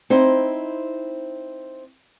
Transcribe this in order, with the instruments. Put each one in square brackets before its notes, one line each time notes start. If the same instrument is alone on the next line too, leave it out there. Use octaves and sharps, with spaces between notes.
[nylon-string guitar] C4 D#4 E4 C5